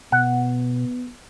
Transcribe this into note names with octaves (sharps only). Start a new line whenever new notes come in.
B2 B3 F#5